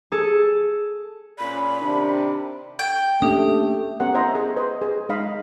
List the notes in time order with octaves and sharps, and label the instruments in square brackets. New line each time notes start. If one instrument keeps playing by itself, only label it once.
[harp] G#4 A4
[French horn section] A#2 C#4 D5 [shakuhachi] B5
[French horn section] C3 D#3 D4
[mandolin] G5
[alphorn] A3 [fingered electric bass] A#3 C#4 D4 [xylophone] G4 D#6
[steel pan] B3 C#4 G4 A#4 F#5
E4 C5 D#5 E5 A#5
G#4
B4 C5 D#5
G#4
G#3 D#4 D#5 F5 B5